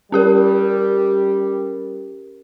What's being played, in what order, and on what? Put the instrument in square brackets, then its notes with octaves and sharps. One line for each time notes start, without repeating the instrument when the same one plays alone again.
[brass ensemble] G3 [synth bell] C#4 G4 A#4